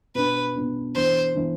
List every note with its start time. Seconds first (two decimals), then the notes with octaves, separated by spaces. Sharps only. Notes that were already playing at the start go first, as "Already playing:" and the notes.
0.15 B2 B3 D4 B4
0.55 B2 B3 D4
0.95 E3 B3 D4 C5
1.35 E3 B3 D4